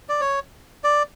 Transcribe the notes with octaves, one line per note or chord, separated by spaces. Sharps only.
D5
C#5
D5